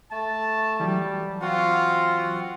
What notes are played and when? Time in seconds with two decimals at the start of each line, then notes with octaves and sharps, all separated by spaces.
0.11 A3 A5
0.80 E3 F#3 G3
1.41 C4 F4 F#4 F#5